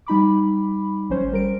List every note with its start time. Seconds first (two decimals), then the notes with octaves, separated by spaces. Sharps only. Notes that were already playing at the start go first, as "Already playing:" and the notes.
0.06 G3 D#4 B5 D6
1.09 G#1 F#3 C#4 C5
1.32 G3 A#4 D7